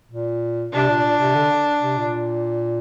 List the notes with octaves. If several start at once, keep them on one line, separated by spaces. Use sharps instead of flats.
A#2
C3 D4
A#2
A#2
C3
D3
C3
A#2